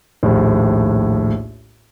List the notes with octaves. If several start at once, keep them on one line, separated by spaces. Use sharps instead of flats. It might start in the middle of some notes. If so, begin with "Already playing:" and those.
A#1 D#2 A2